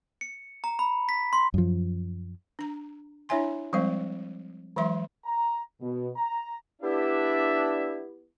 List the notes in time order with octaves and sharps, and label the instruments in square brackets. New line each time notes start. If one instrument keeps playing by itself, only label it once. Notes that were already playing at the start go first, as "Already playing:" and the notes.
[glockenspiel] C#7
A#5
B5
B6
C6
[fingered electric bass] F#2 F3
[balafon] D4 A#5
D4 E4 C#5 E5 G#5 C6
F3 G3 G#3 C4 C5 F5
E3 F#3 G#3 E5 C6
[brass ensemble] A#5
B2
A#5
[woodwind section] B3 E4 G4 [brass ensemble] D4 E5